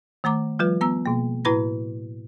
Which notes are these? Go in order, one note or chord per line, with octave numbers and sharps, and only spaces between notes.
D#3 A3 A#5 D6
F3 G3 F4 B4
B3 A#5 E6
B2 A#3
A2 E4 B4 B5 A#6